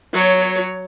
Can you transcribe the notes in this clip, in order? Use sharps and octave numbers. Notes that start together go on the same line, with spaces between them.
F#3 C#5